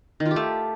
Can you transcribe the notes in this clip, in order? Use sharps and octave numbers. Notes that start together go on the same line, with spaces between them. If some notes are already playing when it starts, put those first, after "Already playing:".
D#3
F4
G4
A3